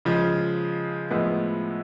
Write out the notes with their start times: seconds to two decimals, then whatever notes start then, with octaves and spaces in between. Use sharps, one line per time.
0.05 C#3 F3 G#3
1.11 A2 F3 G#3 B3 E4